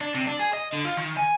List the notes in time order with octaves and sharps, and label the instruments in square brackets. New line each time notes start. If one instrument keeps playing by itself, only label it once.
[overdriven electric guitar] D4
C3
D4
G#4
D#5
D3
F4
D#3
G#5